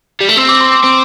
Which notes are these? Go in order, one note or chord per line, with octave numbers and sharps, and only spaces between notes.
G3
A3
C4 E6
D6
C6
D6
C4